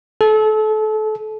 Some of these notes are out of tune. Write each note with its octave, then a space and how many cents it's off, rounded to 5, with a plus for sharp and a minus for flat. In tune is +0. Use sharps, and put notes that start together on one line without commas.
A4 -30